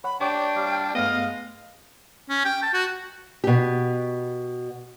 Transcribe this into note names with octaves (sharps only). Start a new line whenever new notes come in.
C#5 F#5 B5
D4 G4 C#5 G5 C#6 D6
G3 F5
G2 G#3 A3 B3 D#5 F5
C#4
G5
A5
F#4
B2 G4